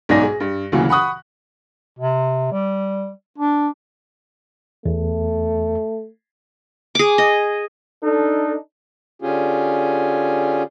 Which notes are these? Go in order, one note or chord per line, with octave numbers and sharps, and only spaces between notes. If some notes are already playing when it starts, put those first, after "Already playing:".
B1 G#2 D#4 D5 G#5 A#6
G#4
G2
D2 A#2 C#3 E3 F#3
F#5 B5 C#6 D#6 F#6
C3
G3
D4
E2 A3
G#4 D6
D#5
D4 D#4 A4
D3 C#4 F4 G4 G#4